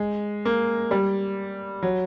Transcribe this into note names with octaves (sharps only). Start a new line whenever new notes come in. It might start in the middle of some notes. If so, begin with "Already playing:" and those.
Already playing: G#3
A#3
G3
F#3